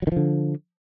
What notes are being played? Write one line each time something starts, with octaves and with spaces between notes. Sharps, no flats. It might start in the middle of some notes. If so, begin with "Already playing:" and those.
D3 D#3 F3 F#3